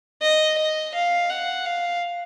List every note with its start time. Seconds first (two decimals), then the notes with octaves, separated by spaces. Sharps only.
0.22 D#5
0.58 D#5
0.94 F5
1.30 F#5
1.66 F5